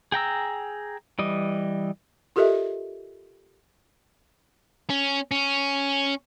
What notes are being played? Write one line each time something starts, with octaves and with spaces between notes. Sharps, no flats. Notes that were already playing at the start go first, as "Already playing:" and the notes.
G#4 G5 A#5 E6
E3 G3 D#5
F4 G4 A4 A#4 D#5 E5
C#4
C#4